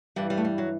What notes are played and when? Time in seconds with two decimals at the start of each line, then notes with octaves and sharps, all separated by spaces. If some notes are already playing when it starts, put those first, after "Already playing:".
0.16 G2 E3 G3
0.30 G3
0.37 A3
0.45 G3
0.58 F#3